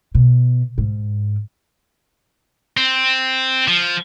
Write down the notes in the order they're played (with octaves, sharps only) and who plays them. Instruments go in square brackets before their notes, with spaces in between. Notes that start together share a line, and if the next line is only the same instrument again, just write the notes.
[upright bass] B2
G#2
[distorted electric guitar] C4
F3